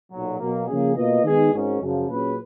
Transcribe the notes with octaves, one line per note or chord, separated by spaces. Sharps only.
B1 A#2 F#3
B2 F#3 A#3
C#3 F3 A#3 C#4 G#4
B2 A#3 F4 B4 D#5
D#3 G#3 B3 D#4 G#4
G#1 G#2 D#3 G#3 C#4
F#2 C#3 F3
A#2 F#3 C#4 G#4 B4